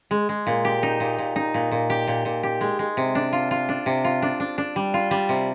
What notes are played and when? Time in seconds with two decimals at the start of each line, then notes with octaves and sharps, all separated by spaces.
0.11 G#3
0.29 G#3
0.47 A#2
0.65 G4
0.83 D#4
1.00 A#2
1.18 A#2
1.36 D#4
1.54 A#2
1.71 A#2
1.90 G4
2.07 A#2
2.25 A#2
2.43 G4
2.61 G#3
2.79 G#3
2.97 C3
3.15 D4
3.33 F4
3.51 F4
3.69 D4
3.86 C3
4.05 F4
4.22 D4
4.40 D4
4.58 D4
4.76 G3
4.94 F4
5.11 G3
5.29 C3